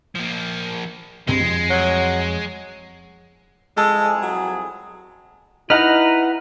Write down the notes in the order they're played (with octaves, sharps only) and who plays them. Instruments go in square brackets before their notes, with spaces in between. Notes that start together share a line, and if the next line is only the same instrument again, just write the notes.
[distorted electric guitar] F3 A#3
[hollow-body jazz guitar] C2 G2 C3 [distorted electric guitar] G#3
[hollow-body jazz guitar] F2
[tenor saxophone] F#3
[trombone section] C2 F2 G#4 [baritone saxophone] G#3 [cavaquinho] A4
[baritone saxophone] F#3
[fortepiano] D#4 [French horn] E4 [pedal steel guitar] B4 F#5 [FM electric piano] A#5 F6